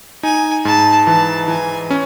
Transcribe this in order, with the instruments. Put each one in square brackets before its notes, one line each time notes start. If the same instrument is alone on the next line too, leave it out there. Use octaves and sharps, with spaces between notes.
[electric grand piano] D#4 [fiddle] G#5
[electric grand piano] G#2 [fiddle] A5
[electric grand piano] E3 [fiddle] A5
[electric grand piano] E3 [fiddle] G#5
[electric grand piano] C#4